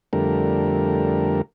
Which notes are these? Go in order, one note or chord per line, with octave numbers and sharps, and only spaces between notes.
F2 D3 G3 A3 A#4